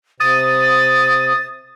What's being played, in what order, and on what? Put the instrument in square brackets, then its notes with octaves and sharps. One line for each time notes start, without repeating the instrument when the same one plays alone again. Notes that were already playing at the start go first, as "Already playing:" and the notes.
[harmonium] C3 [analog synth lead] D#6 [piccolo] A6